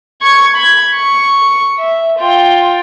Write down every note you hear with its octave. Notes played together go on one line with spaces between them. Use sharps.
C#6 G#6
B5 G#6
C#6
E5
F4 G5